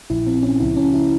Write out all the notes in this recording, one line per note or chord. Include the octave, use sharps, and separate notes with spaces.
A#1 A#2 F3 E4
C4
C#4
C#2 C#3 F3 E4
C#4
E4